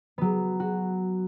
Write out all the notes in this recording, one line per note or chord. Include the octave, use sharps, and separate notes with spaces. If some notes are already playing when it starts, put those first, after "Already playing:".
F#3 B3
F#4